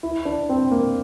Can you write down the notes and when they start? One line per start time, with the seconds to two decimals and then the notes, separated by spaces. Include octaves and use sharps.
0.03 E4
0.25 D4
0.49 C4
0.71 A#3